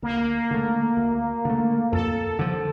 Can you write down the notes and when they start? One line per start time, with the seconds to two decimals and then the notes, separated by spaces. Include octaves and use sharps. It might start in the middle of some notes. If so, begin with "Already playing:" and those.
0.02 D2 A#3
0.51 D3 A3
0.97 D2
1.45 D3 A3
1.92 F2 A4
2.39 D3 F3